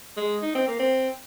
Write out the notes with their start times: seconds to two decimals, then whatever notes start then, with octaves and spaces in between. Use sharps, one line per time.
0.17 G#3
0.42 D#4
0.55 C4
0.67 A#3
0.79 C4